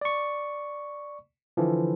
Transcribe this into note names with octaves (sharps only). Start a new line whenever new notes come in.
D5 C#6
D3 E3 F3